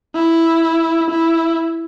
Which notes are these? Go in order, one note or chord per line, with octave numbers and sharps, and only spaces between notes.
E4
E4